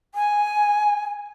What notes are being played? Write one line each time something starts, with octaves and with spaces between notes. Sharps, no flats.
G#5